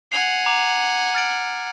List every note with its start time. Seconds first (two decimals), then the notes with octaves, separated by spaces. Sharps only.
0.12 F#5 G#5 C7 F7
0.46 A#5 D6 F7
1.15 F6 A6 D7